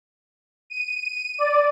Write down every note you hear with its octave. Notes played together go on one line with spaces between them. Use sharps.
D#7
D5